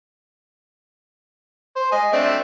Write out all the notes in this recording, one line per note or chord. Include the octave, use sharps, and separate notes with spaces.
C5
D#5 G#5
A3 C4 D4